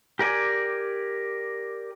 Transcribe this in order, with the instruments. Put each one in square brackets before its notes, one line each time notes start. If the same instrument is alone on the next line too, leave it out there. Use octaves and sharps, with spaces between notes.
[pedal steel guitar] G4 A#4 D5 G#5